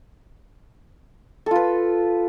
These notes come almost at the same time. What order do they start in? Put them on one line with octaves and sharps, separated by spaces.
A4 F4 B4